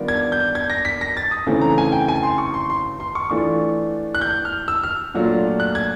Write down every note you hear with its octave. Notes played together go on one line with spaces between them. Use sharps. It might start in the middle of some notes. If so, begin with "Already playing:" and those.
Already playing: D#3 G3 B3 D4 F4
G#6
G6
G#6
A#6
B6
A#6
A6
D#6
C#3 E3 A3 C4 D#4
A#5
G#5
G5
G#5
C6
C#6
C6
C6
C6
C#6
E3 A3 D4 F4 C#6
F#6
G6
F6
E6
F6
A#2 F#3 A3 D4 F4
F#6
G#6